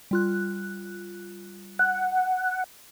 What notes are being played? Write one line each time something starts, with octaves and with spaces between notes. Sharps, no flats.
G3 F4 F#6
F#5